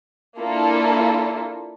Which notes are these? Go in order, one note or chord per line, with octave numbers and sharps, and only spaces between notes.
A#3 D4 E4 F4 A4